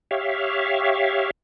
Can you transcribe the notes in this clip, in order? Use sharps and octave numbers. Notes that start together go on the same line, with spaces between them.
G4 C#5 E5 F5